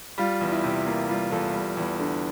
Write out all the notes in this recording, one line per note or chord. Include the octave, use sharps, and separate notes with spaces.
G3 F4
E2
E4
C3
A#3 F4
G3 F4
E2 F4 A4
G3
E2
D3